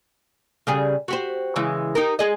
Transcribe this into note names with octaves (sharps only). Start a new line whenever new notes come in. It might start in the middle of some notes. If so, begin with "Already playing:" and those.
C#3 G3 G#4
F#4 G4 C5
C#3 E3 G#3
D#4 G4 A#4
G#3 G#4 D#5